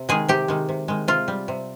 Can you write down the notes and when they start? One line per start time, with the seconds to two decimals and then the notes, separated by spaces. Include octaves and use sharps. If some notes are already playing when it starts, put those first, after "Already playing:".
Already playing: C3
0.09 D#3 G#3 G#4
0.28 C3 G4
0.48 D#3 G#3
0.69 C3
0.88 D#3 G#3
1.08 C3 F4
1.28 G3
1.48 C3